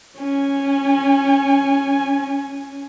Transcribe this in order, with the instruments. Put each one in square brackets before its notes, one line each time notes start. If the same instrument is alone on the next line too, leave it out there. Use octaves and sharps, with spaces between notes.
[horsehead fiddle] C#4 G#5